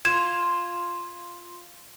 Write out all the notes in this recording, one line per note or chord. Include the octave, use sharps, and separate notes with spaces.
F4 G#6 E7